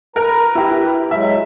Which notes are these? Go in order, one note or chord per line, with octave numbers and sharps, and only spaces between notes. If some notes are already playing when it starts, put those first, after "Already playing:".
A#4 B4 A#5
E4 G4
F#3 G#3 E5